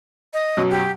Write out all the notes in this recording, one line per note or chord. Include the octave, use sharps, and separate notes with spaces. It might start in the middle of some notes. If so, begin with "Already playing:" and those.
D#5
F#2 B2 F#3
G4